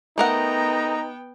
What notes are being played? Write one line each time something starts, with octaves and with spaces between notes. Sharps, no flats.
A3 B3 D#4 A#4 F#5 G5 A#5